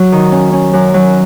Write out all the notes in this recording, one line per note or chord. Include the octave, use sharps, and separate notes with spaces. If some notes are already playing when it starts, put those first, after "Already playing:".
Already playing: F#3 F#4
D#3
C#4
C#4
F#2
F#3